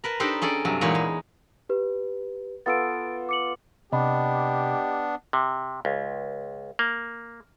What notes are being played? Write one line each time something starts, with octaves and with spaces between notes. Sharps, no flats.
A#4 B4 A5
D4 D#4 G4 A4 C5
C#4 G#4 A4 D5
G2 C3 F#3
E2 A#2 G#3 D#4 C#5 B5
G#3
G4 B4
B3 F4 A4 A6 D7
D6 C#7 F#7
C3 B3 D4 G4 D#5 B5
C3
C#2
A#3